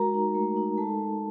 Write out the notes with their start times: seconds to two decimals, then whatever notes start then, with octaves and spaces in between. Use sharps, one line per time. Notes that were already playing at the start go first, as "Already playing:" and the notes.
Already playing: G#3 F#4 A#4 A#5
0.14 D#4
0.35 A3
0.57 D#4
0.77 G#3 A4 A5
0.99 G#3